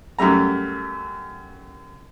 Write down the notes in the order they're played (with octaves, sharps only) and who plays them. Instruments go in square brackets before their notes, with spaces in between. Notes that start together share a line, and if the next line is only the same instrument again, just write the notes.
[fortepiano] F#2 G3 A3 A#5